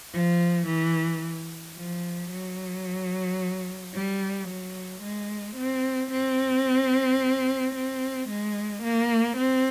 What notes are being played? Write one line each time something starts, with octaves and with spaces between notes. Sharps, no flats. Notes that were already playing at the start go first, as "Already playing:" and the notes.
F3
E3
F3
F#3
G3
F#3
G#3
C4
C4
C4
G#3
A#3
C4